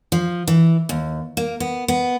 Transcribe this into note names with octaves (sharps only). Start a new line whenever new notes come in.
F3
E3
D#2
A#3
B3
B3